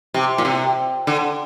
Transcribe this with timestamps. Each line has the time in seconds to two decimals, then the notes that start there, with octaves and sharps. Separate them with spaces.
0.14 C3
0.38 A#2
0.45 C3
1.07 D3